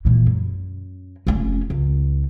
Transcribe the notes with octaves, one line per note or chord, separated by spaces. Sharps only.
A#2 E3
F#2
F1 C#4
C#2